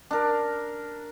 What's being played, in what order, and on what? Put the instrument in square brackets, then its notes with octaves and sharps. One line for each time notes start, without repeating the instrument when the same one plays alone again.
[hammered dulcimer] D4 A#4